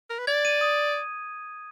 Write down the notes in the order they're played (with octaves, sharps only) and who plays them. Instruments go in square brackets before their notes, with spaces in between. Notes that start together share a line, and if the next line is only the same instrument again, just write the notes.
[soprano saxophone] A#4
B4
[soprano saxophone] D5 [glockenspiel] G#6
[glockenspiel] D#7
D#6